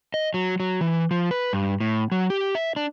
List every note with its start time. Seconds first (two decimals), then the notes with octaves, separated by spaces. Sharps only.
0.14 D#5
0.34 F#3
0.60 F#3
0.81 E3
1.11 F3
1.31 B4
1.53 G2
1.80 A2
2.12 F#3
2.30 G4
2.55 E5
2.76 D4